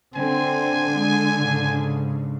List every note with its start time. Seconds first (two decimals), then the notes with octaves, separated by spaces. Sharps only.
0.15 D3 C4 G#5
0.91 G#3
1.38 G#2 C#3